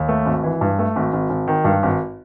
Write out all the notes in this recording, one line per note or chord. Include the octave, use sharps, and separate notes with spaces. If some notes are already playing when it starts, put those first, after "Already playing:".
Already playing: D#2
A3
G#1
E3
G2
A3
G#1
G#1
G#1
D#3
G2
G#1